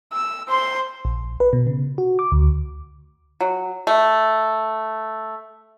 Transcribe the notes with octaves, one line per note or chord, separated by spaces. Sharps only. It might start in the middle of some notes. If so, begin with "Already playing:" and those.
E6
C5 C6
A#1
B4
B2
C#3
F#4
D6
D2
F#3
A3